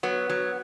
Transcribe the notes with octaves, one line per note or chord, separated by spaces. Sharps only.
F#3 B3
F#3